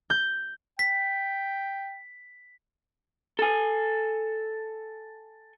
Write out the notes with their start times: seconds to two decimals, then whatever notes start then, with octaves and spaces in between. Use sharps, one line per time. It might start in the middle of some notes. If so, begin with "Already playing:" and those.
0.10 G6
0.79 G5 B6
3.39 A4 G#5